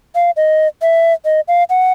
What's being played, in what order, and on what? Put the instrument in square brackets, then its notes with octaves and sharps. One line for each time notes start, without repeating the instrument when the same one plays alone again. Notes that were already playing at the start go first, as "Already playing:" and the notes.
[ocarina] F5
D#5
E5
D#5
F5
F#5